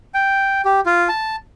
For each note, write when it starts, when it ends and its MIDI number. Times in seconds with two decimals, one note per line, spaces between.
0.14 0.61 79
0.65 0.80 67
0.86 1.08 65
1.09 1.36 81